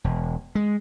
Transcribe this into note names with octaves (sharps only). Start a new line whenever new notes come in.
E1
G#3